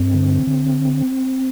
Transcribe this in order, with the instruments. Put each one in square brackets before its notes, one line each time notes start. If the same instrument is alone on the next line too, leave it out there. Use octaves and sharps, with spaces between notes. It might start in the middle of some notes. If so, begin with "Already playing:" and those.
Already playing: [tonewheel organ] G2 C4
D3
D3